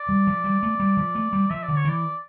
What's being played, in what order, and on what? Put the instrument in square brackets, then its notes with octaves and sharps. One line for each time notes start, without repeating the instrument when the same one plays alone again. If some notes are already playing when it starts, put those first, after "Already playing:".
Already playing: [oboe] D5
[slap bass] G3
F3
G3
A3
G3
F3
A3
G3
[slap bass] F3 [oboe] E5
[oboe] D5
[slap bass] D3
[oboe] C#5
[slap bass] E3 [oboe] D5